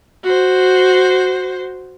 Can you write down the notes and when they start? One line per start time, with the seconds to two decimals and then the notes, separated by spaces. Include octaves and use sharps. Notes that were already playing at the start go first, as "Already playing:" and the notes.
0.23 F#4 C5